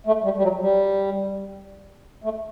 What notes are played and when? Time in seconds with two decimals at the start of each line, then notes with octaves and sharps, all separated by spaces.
0.07 A3
0.24 G3
0.37 G3
0.43 F#3
0.61 G3
2.24 A3